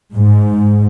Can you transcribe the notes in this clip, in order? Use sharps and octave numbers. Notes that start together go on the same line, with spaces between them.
G#2